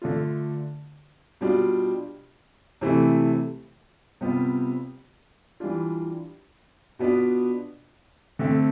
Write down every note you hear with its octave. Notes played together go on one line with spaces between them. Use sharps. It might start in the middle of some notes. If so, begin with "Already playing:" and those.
D3 A3 D4 F4
B2 G3 D4 F4
C3 E3 A3
C3 G3 B3 F4
E3 G3 D4 F4
B2 B3 D4 F4
D3 A3 C4